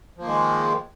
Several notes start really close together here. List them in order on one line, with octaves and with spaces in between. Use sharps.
F3 A#3 D#3 G#3